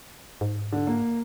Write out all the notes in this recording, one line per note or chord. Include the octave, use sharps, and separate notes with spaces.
G#2
D3
A#3